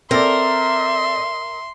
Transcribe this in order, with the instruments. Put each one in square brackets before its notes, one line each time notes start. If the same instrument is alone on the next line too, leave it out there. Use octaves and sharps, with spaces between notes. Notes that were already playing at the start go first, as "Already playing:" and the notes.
[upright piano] C4 A4 D5 [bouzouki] A#4 [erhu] E5 [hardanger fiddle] C6